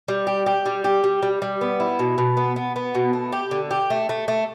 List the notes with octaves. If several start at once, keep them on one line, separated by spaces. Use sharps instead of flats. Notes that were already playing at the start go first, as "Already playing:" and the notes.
G3
G4
G4
G3
G4
G3
G3
G3
B3
E4
B2
B2
B3
B3
B3
B2
A3
G4
D3
G4
A3
A3
A3